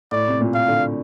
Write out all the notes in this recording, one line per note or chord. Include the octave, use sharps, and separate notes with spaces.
A2 D5
C3
A#2
F5
D3